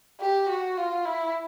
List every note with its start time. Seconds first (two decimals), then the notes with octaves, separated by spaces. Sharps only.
0.20 G4
0.49 F#4
0.77 F4
1.05 E4